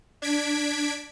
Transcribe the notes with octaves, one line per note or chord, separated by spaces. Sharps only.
D4 G#6 B6 D7